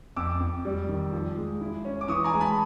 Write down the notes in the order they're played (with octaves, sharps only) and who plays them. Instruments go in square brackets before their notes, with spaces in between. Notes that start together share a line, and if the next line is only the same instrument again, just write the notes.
[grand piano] F2 D6 E6
F2
G3
D#3
F3
G#3
E4
C#4
D6
E3 C#6 D#6
G#5 A#5
G#3
A5 B5